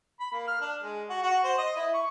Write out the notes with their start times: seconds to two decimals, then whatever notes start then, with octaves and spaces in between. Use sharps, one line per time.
0.20 B5
0.33 A#3
0.48 F6
0.61 D4
0.83 G#3
1.10 F#4
1.23 F#4
1.44 C5
1.58 D#5
1.76 E4
1.94 C#6